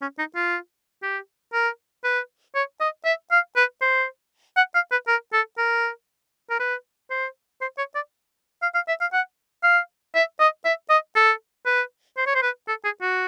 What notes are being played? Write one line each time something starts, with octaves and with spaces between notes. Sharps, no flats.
C#4
D#4
F4
G4
A#4
B4
C#5
D#5
E5
F5
B4
C5
F#5
F5
B4
A#4
A4
A#4
A#4
B4
C5
C5
C#5
D5
F5
F5
E5
F5
F#5
F5
E5
D#5
E5
D#5
A4
B4
C5
C#5
C5
B4
A4
G#4
F#4